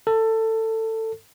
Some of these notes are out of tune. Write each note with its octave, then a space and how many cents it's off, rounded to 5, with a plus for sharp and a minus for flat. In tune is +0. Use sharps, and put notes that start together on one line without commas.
A4 +20